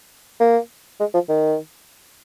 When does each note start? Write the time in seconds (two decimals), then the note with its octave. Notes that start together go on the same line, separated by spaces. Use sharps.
0.40 A#3
1.00 G#3
1.14 F3
1.29 D#3